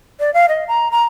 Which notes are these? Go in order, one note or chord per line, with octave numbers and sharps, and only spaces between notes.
D5
F5
D#5
A#5
A#5